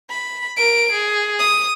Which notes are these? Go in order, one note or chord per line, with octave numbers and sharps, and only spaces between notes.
B5
A#4 D7
G#4
D#6